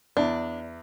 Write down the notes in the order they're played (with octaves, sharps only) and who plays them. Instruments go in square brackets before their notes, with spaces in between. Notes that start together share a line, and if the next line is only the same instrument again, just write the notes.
[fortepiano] E2 [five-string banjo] D4